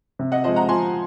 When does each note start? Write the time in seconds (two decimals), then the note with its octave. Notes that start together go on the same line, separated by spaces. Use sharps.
0.19 C3
0.32 D#5 F#5
0.44 F3 C5 D#5
0.48 G#3
0.56 F#5 A#5
0.68 F3 G#5 C6